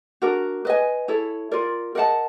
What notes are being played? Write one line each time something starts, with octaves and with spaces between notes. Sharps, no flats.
D4 F#4 A#4
B4 D#5 G#5
E4 A4 C#5
F4 A#4 D5
A#4 D#5 F#5 A5